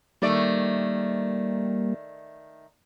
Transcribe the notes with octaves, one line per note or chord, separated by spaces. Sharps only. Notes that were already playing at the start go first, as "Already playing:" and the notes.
D#3 G3 A3 A#3 D5